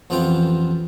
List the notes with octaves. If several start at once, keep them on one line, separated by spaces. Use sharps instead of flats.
A1 F2 F3 B3 F4 G5